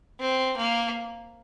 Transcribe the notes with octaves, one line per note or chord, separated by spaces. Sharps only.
C4
A#3